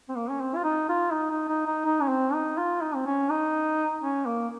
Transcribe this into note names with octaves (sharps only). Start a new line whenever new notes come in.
C4
A#3
C#4
C4
F4
D#4
F4
D#4
D#4
D#4
D#4
D#4
C#4
C4
D#4
F4
D#4
C4
C#4
D#4
C#4
A#3